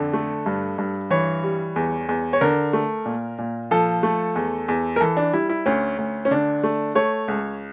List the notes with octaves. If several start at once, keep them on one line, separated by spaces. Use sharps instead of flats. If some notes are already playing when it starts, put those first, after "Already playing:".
Already playing: F2 D3 A4
A3
G2
G2
E3 C#5
G3
E2
E2
C#5
D3 A#4
A3
A#2
A#2
F3 A4
A3
E2
E2
A#4
E3 A4
D4
G3 E4
E4
D2 C#4
D2
C#4
D3 D4
A3
A3 C#5
C#2